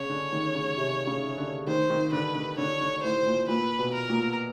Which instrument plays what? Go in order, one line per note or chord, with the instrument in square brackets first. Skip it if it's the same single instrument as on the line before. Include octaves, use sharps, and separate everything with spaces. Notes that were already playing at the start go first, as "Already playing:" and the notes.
Already playing: [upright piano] C#3 [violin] C#5
[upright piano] D3
D#3
C#3
C3
C#3
D3
[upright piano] D#3 [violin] C5
[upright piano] D#3
[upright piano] D3 [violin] B4
[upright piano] D3
[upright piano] D3 [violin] C#5
[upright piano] D3
[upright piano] A2 [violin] C5
[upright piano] A#2
[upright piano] A#2 [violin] B4
[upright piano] B2
[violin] A#4
[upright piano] A#2